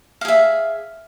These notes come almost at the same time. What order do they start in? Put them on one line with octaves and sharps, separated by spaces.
F5 G#4 E5